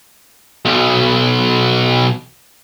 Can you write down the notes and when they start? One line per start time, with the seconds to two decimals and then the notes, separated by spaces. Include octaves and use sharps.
0.66 B1 B2